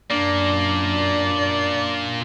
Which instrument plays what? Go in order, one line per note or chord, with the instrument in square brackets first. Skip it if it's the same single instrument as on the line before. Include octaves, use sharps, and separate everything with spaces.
[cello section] F#2 [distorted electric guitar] A#2 A#3 [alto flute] D4 [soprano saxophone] D5